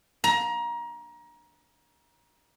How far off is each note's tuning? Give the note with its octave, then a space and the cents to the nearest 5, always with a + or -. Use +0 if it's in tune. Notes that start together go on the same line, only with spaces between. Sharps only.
A#5 +25